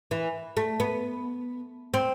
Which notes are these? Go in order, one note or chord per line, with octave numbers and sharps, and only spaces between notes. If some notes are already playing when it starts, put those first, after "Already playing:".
E3
A3
B3
C4